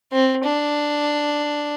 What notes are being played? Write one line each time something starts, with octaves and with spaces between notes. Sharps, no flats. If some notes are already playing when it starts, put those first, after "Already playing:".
C4
D4